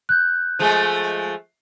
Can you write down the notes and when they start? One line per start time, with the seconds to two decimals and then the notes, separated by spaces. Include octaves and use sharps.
0.09 F#6 G6
0.59 F3 G#3 A3